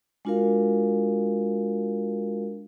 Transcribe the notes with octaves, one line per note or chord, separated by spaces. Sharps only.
G#3 D4 F4 F#4 A#4 F5